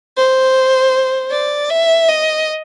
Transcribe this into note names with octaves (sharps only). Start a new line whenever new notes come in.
C5
D5
E5
D#5